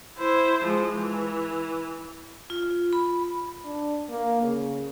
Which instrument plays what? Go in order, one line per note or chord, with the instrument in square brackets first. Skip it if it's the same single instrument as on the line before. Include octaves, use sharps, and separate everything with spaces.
[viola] E4 C5
F3 G#3
E3
[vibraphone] F4
B5
[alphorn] D4
A#3
C#3